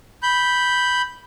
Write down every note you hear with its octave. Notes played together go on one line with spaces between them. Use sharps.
B5 G6